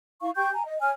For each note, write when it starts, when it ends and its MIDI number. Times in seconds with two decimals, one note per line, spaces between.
0.21 0.30 64
0.21 0.30 77
0.21 0.30 85
0.35 0.50 67
0.35 0.50 79
0.35 0.50 85
0.35 0.50 91
0.53 0.63 80
0.53 0.63 82
0.65 0.78 75
0.81 0.90 73
0.81 0.90 80
0.81 0.90 89